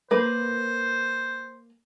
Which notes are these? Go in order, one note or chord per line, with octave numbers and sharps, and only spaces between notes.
A#3 B4 C5